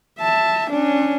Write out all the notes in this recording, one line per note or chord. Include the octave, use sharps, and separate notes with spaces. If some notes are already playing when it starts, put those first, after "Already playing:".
E5 A5
C#4 D4